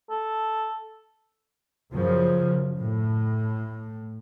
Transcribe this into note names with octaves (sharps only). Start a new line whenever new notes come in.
A4
F#2 C#3 F3
A2